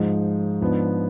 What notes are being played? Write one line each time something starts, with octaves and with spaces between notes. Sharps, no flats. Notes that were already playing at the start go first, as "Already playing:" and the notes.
Already playing: G#2 F3 G#3
G#2 F3 B3 D4